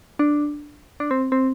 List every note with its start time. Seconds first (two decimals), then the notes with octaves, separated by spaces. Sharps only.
0.19 D4
1.00 D4
1.11 C4
1.32 C4